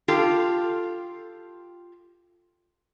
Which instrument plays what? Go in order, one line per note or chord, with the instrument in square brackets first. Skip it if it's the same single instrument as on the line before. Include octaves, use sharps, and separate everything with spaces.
[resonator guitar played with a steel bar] F4 G4 A4